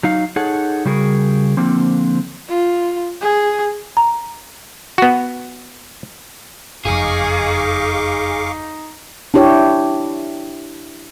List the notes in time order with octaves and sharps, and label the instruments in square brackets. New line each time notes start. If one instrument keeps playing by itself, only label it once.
[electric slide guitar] F#3 D#4 F5
D#4 G#4 A4 C#5 F#5
C#3 G3 F#4 G#4 A#4
D3 F3 A#3 C4
[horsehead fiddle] F4
G#4
[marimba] A#5
[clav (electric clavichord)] B3 F#4
[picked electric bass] F#1 F2 [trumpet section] D#4 [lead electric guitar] G#4 [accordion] F5 C#6 D6
[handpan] D4 E4 G4 C#5